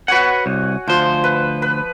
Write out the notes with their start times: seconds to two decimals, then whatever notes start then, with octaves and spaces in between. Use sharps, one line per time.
0.08 F#4 B4 C#5 F#5 G#5
0.46 C2
0.87 D2 F3 C5
1.24 B4
1.62 B4